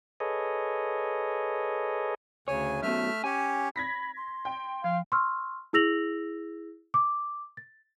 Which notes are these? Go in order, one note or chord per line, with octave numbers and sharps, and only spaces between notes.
G#4 A4 B4 C#5 D#5
D2 C#3 C#5 G#5
F#2 B2 A3 E5 F6
C#4 G4 C#5 G#5
B5 G#6 A#6 B6
C6
G5
F3 F5
C6 C#6 E6 F6
E4 G#4 E6 A#6 F7 F#7
D6
A6